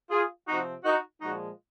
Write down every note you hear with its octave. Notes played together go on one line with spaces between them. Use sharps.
F4 G#4
C3 F3 C4 D#4 F#4
D#4 F#4
A#2 F3 G#3 D#4 F#4